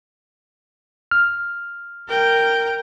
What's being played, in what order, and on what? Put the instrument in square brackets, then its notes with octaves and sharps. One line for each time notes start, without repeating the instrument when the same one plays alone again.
[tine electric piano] F6
[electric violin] A#4 G5